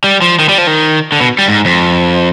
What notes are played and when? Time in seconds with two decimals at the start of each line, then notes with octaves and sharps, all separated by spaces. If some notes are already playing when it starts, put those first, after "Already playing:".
0.04 G3
0.22 F3
0.39 D#3
0.49 G3
0.58 F3
0.67 D#3
1.12 D3
1.21 B2
1.39 G3
1.48 G#2
1.65 F2